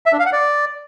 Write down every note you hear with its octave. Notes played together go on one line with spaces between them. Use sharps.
E5
D4
F5
F#5
D5